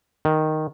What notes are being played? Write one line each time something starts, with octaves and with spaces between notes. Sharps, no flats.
D#3